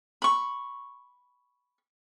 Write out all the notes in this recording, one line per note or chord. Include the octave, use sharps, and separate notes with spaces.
B5 C#6